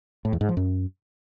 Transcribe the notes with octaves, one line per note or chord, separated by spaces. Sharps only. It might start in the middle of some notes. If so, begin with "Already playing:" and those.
A2
E2
G#2
F3
F#2